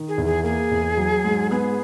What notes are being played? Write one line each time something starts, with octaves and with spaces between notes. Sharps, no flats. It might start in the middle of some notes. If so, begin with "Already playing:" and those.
Already playing: D#3
G#4
E2
G#4
A#3 G#4
E2
F#3
G#2
B3 G#4